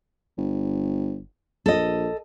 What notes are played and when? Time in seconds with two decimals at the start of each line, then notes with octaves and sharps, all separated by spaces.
0.38 G1
1.66 A#1 A4 D#5